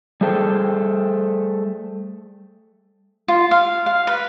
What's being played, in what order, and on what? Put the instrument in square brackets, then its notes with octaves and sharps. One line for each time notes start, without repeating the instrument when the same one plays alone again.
[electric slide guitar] G3 A3 G#4 A4 C5 G5
[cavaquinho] F4
F5
F5
B4